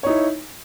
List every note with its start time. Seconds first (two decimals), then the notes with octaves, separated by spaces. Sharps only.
0.03 C#5
0.06 D#4
0.09 E4